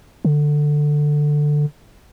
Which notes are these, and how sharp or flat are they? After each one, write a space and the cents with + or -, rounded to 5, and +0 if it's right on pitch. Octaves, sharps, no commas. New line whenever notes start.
D3 +10